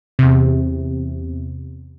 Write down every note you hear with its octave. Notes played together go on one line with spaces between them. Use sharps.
E2 C3